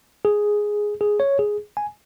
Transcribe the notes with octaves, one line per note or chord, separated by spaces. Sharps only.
G#4
G#4
C#5
G#4
G#5